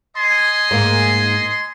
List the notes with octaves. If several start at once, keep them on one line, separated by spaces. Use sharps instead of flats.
D#5 G#5 C6
G#2 A#3